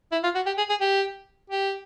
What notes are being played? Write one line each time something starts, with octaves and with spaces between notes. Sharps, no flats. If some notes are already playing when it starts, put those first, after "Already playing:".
E4
F4
F#4
G4
G#4
G#4
G4
G4